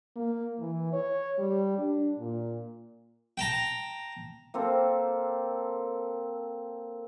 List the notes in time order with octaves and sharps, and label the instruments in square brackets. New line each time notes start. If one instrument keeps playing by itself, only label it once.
[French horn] A#3
E3
C#5
G3
D4
A#2
[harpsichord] G5 A5 A#5
[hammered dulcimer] A#3 C4 A4